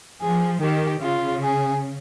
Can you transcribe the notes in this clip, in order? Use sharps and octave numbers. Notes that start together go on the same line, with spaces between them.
F3 G#4
D#3 G4
C#3 F4
G#4